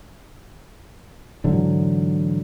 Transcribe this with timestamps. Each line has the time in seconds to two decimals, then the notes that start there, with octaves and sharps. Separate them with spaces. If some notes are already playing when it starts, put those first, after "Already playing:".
1.44 G#2 D3 E3 F#3